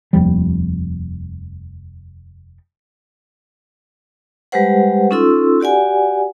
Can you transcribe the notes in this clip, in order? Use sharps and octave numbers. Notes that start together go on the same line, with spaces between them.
F1 D#2 F3 G3
G3 G#3 G4 B4 C5 F#5
C#4 D#4 F4 A4 C6 E6
F#4 G4 D5 F#5 G#5